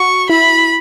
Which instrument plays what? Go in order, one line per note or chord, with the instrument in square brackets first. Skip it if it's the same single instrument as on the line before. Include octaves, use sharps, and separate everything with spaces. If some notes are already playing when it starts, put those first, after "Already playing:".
Already playing: [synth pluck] F#4 [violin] C#6
[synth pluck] E4 [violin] B5